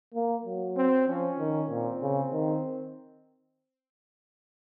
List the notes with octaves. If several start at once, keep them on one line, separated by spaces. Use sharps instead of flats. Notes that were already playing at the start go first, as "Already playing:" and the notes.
A#3
F#3
C4
F3 C#4
D#3
A#2 C4
C#3
D#3